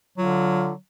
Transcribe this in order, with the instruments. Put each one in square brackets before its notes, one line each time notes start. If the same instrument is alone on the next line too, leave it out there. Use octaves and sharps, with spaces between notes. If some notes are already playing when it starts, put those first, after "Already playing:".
[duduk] D3 [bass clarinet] F#3 [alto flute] F4